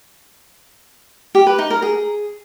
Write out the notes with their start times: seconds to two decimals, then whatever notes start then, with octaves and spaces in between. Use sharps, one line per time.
1.35 G4
1.47 B4
1.59 D#4
1.70 A#4
1.82 G#4